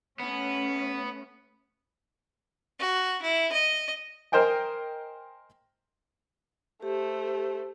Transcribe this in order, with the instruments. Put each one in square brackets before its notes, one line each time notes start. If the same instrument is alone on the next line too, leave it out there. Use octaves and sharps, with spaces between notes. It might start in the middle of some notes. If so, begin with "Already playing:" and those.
[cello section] A3 C#4 [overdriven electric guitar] B3
[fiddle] F#4
E4
D#5
[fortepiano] A#4 C5 D#5 G5 G#5
[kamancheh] A3 C5 [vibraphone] G4